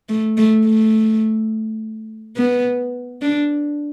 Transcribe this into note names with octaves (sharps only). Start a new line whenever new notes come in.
A3
A3
A3
B3
D4